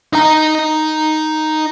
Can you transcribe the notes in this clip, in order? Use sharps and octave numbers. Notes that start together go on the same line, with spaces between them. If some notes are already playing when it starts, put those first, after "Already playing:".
D#4 A#5